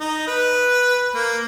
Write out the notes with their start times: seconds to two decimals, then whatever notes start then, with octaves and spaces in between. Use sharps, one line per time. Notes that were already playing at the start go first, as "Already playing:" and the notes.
0.01 D#4
0.27 B4
1.15 A#3